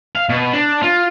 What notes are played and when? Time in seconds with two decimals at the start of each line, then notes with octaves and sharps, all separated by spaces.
0.15 F5
0.29 B2
0.53 D4
0.83 F4